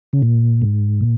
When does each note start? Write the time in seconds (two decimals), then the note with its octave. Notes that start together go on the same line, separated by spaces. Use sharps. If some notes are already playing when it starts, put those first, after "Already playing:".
0.13 C#3
0.22 A#2
0.62 G#2
1.01 A#2